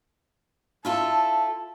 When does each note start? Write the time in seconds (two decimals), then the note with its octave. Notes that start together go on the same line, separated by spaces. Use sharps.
0.85 E4 F4 A4 A5